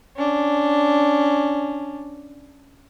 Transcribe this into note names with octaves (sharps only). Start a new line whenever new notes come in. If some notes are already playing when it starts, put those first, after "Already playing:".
C#4 D4